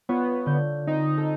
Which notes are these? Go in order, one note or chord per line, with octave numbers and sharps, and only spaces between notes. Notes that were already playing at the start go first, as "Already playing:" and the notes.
B3 F4 C#5
D3 G6
C4 D#4
A4